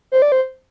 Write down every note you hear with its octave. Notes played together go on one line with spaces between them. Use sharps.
C5
D5
C5